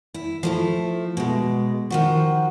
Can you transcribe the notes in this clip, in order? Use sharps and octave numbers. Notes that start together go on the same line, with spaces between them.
E4
F3 A3 E4
B2 G#3
D#3 F3 F#4